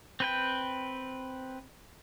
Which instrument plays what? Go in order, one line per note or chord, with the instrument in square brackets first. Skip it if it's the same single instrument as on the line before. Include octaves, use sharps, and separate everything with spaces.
[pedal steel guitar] C4 B4 G5